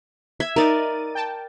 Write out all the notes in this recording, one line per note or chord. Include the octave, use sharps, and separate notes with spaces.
E5 G#6
D#4 A#4 D5 A6 D#7
G5 A5